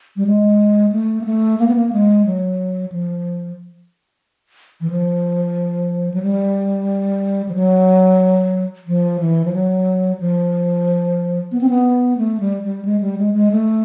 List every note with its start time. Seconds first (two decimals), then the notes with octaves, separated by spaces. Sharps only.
0.16 G3
0.27 G#3
0.92 A3
1.21 A#3
1.25 A3
1.59 A#3
1.68 B3
1.75 A#3
1.93 G#3
2.26 F#3
2.92 F3
4.81 E3
4.90 F3
6.14 F#3
6.23 G3
7.49 F3
7.55 F#3
8.87 F3
9.20 E3
9.45 F3
9.53 F#3
10.20 F3
11.52 B3
11.61 C4
11.69 B3
12.18 A3
12.40 G3
12.63 G3
12.85 G#3
13.01 G3
13.18 G#3
13.34 G#3
13.51 A3